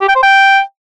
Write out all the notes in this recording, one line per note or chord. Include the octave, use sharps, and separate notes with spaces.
G4
G5
C5
G5